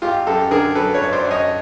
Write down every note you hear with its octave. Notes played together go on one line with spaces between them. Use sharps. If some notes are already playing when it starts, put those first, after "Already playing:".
G#1 F4 G4
F#2 G4 A4
D3 G#4 A#4
F#3 A4 B4
B4 C#5
G#1
C5 D5
F#2
C#5 D#5